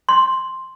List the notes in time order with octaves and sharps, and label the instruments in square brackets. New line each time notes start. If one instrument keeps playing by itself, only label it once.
[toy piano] C6